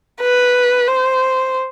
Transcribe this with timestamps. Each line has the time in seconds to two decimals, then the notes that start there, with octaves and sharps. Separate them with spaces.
0.21 B4
0.87 C5